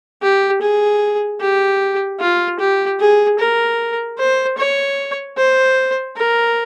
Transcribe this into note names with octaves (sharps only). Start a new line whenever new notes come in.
G4
G#4
G4
F4
G4
G#4
A#4
C5
C#5
C5
A#4